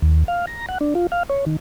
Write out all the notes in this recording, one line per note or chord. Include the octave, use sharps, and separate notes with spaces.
D#2
F5
A#5
F#5
D4
F4
F5
C#5
D#3